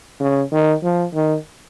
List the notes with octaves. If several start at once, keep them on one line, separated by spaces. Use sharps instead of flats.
C#3
D#3
F3
D#3